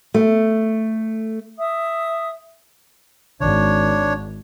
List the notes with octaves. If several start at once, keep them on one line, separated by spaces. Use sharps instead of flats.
A3
E5 D#6
G#1 D4 C#5